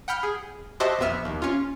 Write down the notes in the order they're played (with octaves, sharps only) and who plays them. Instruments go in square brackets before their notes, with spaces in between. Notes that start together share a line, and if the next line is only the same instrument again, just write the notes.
[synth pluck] F#5 G5 B5 F6 G6
G#4
F#4 G4 C5 D#5 E5 A5
A#1 F2 B3 E5 F6
D#2
C#4 F4